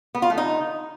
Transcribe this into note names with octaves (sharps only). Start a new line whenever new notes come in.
B3
F4
A3
D#4